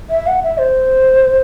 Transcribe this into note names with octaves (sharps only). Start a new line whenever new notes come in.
E5
F#5
E5
C5